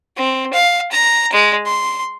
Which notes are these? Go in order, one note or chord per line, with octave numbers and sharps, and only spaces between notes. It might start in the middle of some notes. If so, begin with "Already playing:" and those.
C4
F5
A#5
G#3
C6